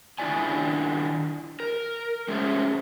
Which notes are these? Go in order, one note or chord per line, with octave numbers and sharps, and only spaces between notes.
D#3 D4 E4 F4 D5 G#5
A#4
G#3 A3 C#4 G#4 C5 E5